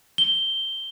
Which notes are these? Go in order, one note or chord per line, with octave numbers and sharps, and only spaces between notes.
G7